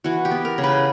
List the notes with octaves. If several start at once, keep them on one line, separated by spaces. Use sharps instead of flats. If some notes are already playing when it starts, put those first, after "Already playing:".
E3 F#4
G4
B3
A#4
C#3
B4